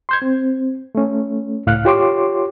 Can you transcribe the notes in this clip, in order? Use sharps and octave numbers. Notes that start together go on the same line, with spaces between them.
C6 G6 G#6
C4
A3 C#4
C#2 A2 F5 F6 F#6
F4 G4 C#5 C6 D6